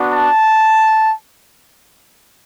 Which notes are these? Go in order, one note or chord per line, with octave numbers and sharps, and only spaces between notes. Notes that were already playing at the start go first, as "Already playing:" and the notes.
Already playing: B3 D4 F#4
A5